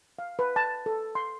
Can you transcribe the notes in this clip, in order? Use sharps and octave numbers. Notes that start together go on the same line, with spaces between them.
F5
B4
A5
A4
C6